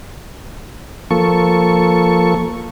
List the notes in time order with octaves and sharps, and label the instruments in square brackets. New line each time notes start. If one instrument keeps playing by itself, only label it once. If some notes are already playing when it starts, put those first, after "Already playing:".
[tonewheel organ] F3 A#3 A4 C#6